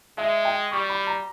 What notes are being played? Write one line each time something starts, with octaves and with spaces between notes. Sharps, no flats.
G#3 E5
G5
G3 C#6
B5
A#5